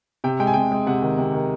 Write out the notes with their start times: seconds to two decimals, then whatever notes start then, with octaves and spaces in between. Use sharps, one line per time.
0.24 C3 G5
0.40 G#3 G5
0.47 G#5
0.54 C3 G5
0.72 G#3
0.86 C3 F#5
1.02 D#3
1.18 C3
1.33 D#3